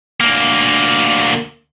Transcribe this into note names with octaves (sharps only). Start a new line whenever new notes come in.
D2 A#3